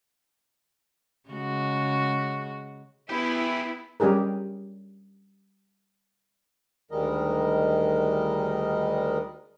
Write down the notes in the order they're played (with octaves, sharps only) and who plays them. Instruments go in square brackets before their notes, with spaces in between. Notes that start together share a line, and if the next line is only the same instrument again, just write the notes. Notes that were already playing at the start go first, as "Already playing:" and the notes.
[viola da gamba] C#3 G#3 F#4
[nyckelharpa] B3 [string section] E4 [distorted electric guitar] G4 G#4
[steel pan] G3 C#4 G4 G#4 A#4
[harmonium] D2 D#3 G3 G#3 A#4 D#5